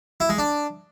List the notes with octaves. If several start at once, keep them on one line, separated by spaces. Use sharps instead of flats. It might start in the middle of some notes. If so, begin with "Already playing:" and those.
E4
G#3
D4